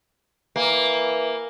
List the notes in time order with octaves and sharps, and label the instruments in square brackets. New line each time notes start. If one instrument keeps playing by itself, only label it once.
[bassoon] E3 [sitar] A#3